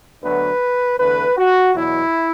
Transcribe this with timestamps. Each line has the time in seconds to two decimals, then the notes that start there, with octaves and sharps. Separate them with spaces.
0.23 D2 D3 F#3 B3 B4
0.98 E2 D3 A3 B4
1.37 F#4
1.75 E2 B2 F#3 E4